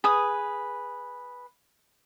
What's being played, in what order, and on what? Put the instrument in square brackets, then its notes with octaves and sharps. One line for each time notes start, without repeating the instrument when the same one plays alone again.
[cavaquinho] G#4 B4 D#6